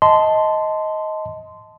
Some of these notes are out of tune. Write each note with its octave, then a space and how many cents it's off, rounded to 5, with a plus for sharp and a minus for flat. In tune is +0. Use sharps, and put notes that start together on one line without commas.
D#5 +15 A5 -5 C6 -15